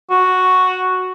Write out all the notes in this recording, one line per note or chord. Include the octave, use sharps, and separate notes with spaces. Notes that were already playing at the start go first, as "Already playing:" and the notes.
F#4